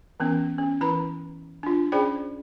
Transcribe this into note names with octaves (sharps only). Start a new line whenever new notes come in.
E3 B3 C#4
C#4
E3 E4 B4 A#5 B5
D4 F4
C#4 G#4 C5 D5 G5 B5